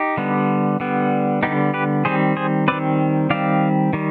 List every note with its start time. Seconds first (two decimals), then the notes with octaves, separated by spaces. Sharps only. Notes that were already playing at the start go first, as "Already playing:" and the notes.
Already playing: D#4 G4
0.17 D3 G3 B3
0.80 D3 G3 B3
1.43 D3 G3 B3 D#4 G4
1.74 G4 B4
2.05 D#3 G3 C4 G#4 C5
2.37 G#4 C5
2.68 D#3 G3 C4 B4 D5
3.30 D#3 G3 C4 D5 F5
3.93 D#3 G3